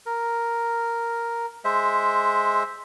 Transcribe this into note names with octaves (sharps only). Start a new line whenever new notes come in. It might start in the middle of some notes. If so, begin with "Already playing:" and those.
A#4
G#3 C5 E5